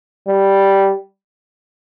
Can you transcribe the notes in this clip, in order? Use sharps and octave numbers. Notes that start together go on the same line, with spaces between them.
G3